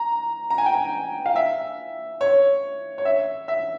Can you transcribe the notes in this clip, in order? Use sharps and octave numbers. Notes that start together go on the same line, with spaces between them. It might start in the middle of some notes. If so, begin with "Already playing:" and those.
Already playing: A#5
A#5
G#5
G5
G#5
F5
E5
C#5
C#5
E5
E5